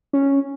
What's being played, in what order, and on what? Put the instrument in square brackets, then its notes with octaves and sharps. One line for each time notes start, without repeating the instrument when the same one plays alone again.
[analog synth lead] C#4